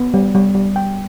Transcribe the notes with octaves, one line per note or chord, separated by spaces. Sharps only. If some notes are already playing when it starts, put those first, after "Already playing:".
Already playing: B3
G3
G3
G3
G5